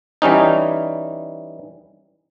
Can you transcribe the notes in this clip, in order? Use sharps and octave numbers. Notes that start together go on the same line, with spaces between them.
E3 G3 C#4 D#4